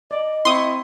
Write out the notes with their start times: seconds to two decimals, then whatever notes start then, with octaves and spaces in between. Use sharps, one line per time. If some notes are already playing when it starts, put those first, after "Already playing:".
0.11 D5 D#5
0.45 C4 E4 C6 C#6 D#6